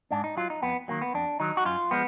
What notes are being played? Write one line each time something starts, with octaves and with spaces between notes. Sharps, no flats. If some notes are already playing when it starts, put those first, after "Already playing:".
G#2 D4
D#4
F#3 F4
D#4
F2 B3
D#3 F#3 A#3
B3
F2 D4
D#3 F#3 D#4
F#4
F#2 F4
F3 G#3 B3